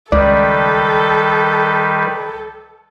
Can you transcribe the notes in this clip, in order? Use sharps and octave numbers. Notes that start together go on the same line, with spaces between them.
C#2 D#3 G3 A4 B4 D5